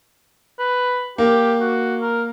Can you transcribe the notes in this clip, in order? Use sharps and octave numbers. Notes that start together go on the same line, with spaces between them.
B4
A#3 G4
F#4
A#4